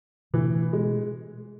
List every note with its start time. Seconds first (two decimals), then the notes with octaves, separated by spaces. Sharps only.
0.33 B2 E3 A3 D4
0.73 G#3